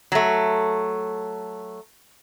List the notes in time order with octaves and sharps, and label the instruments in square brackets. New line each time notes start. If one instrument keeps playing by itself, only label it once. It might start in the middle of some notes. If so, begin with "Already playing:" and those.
[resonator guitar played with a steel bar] F#3 A3